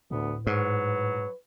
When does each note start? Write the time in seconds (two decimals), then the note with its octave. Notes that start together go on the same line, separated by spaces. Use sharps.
0.11 D2 A2 B3
0.47 G#2 F#3 B4